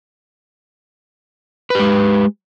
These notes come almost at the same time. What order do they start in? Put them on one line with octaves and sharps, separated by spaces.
B4 G4 G#3